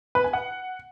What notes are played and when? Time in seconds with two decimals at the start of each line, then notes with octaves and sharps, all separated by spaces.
0.15 B4
0.24 G#5
0.33 F#5